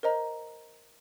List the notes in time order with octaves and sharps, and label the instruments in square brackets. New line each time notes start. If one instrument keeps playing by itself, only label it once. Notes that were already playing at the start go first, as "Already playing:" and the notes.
[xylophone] A#4 C5 D#5 A#5